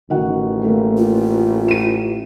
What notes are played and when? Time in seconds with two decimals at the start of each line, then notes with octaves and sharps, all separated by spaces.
0.10 A1 D#3 F#4 F#5
0.64 A3 A#3
0.97 F4
1.68 D#7 E7